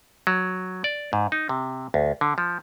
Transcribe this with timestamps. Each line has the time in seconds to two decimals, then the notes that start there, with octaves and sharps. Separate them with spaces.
0.27 F#3
0.84 D5
1.13 G#2
1.32 D#4
1.49 C3
1.94 D2
2.21 D3
2.38 F3